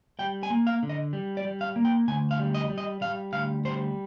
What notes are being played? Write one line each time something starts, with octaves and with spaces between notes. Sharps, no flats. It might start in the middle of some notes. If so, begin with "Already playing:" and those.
G3 G5
G#5
A#3
F5
D3
D#5
G3
D5
G3
F5
A#3
G5
D2 G#5
F5
G3
D#5
G3
D#5
G3 F5
D2 F5
G3 C5